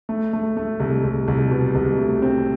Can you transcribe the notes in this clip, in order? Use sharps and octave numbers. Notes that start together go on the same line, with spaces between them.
A3
A3
A3
C2
C2
C2
B2
C2
A3
C4